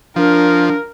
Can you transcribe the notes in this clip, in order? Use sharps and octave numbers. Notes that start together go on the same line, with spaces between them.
F3 D4 A#4